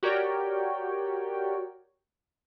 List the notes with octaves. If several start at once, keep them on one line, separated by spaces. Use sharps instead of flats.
F#4 G4 A#4 C#5 D5 G5